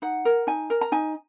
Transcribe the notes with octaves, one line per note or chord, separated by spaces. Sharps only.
D#4 F#5
A#4
D#4 G#5
A#4
A#5
D#4 G#5